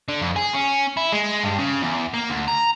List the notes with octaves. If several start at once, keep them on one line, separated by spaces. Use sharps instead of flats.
D3
F2
G#4
C#4
E4
G#3
G2
C#3
E2
A#3
D2
A#5